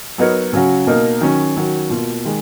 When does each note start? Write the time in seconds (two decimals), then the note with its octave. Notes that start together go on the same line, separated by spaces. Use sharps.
0.18 F#3 B3 D#4 A#4 C#5
0.53 C#3 F#3 C#4 F#4
0.86 B2 A#3 D#4 A#4
1.21 D#3 F#3 C#4
1.56 D#3 F#3 C#4 F#4 C#5
1.90 B2 A#3 F4
2.25 D#3 G#3